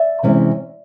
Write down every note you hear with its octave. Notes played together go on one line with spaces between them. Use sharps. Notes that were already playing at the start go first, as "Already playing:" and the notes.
Already playing: D5 E5
C3 E3 G#3 C#4